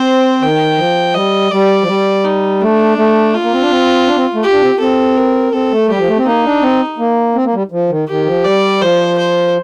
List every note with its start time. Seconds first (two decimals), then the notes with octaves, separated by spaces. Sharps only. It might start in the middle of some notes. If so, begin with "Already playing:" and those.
Already playing: C4 C5
0.41 D#3 G5
0.78 F3
1.14 G3 D#5
1.51 G3 D5
1.82 F3
1.87 G3
2.25 D#4
2.61 A3 D4
2.98 A3
3.34 F4
3.43 A#3
3.53 C4
3.62 D4
3.70 C4
4.07 D4
4.16 C4
4.34 A3
4.43 G4
4.52 D4
4.62 C4
4.80 C4 A4
5.17 A#4
5.53 C4 A4
5.72 A3
5.89 G3 G4
5.99 F3
6.08 A3
6.17 C4
6.25 A#3 D#4
6.45 D4
6.62 C4
6.98 A#3
7.35 C4
7.45 A#3
7.53 G3
7.72 F3
7.90 D#3
8.08 D#3 G4
8.26 F3
8.45 G3 D5
8.81 F3 C5
9.18 C5